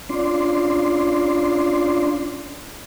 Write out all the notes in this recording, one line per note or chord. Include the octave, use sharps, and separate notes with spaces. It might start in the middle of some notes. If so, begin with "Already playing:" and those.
C#4 D4 F4 D5 C6